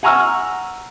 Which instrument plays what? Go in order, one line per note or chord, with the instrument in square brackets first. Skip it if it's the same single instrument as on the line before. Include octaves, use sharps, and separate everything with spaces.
[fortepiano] F#5 G#5 A#5 C#6 E6 F6